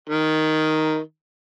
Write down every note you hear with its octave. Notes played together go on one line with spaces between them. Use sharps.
D#3